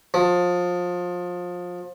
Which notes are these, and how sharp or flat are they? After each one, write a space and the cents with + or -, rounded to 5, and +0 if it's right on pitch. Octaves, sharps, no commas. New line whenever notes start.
F3 +25